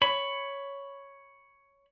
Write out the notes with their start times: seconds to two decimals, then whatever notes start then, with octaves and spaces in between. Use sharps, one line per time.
0.02 C#5 B5